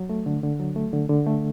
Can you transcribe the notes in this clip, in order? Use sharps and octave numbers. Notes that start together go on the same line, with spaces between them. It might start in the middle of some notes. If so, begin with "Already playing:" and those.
Already playing: F#3
A3
D3
D3
F#3
A3
D3
D3
A3